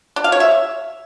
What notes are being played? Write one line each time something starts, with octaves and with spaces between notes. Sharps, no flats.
D4
F5
C#5
E5